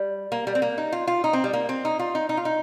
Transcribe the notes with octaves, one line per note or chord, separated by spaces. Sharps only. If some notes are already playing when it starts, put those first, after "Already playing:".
Already playing: G3
A#3
G3
C4
A#3
D#4
F4
F4
D#4
C4
G3
A#3
C4
D#4
F4
D#4
D#4
F4
D#4